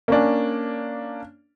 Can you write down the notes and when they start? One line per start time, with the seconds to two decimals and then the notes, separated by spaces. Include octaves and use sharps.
0.08 A#3 C#4 D4